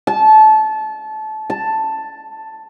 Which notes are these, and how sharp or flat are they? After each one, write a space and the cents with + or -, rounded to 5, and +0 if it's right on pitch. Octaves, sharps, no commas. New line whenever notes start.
A5 -25
A5 +5